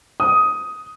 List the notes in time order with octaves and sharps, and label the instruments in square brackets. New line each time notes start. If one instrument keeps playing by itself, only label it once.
[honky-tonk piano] D#6